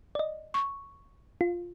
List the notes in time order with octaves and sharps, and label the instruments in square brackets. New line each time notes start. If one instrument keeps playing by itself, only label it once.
[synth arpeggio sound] D5 D#5
[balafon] C#6
[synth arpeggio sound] F4